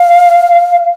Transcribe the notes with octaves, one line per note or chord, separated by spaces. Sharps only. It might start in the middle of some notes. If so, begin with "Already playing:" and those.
Already playing: F5